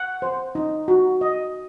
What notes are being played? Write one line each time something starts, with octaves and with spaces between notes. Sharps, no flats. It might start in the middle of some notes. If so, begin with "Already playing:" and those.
Already playing: F#5
C5
D#4
F#4
D#5